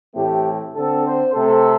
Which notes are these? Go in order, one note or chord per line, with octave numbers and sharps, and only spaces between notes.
A2 E3 A3 C4 G4
D3 C4 A4
C5
C3 A3 C4 A4